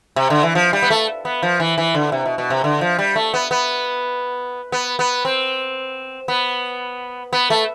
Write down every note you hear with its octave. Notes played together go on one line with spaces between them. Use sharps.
C3
D3
E3
F3
G3
B3
A3
B3
F3
E3
E3
D3
C3
B2
B2
C3
D3
F3
G3
A3
B3
B3
B3
B3
C4
B3
B3
A3